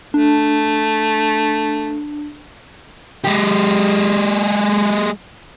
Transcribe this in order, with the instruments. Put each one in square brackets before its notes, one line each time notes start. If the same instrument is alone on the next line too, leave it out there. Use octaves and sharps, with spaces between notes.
[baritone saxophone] A3 [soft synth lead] D4
[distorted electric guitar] G#3 G4